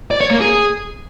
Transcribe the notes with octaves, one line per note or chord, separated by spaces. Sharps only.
D5
C#5
A#3
G#4